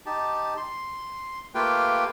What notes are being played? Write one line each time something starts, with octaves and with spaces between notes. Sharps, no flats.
D#4 G4 A5
C6
A3 A#3 F4 G4 B4 G5